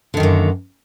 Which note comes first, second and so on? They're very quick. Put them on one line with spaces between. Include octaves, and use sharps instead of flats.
D3 D#3 F#2 A#3